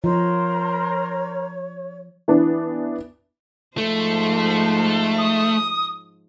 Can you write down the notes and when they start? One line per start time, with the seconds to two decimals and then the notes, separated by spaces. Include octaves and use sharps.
0.04 F3 A#4 C5 C#5 A#5
2.28 E3 B3 D4
3.78 G#2 F3 A3 C5
5.18 D#6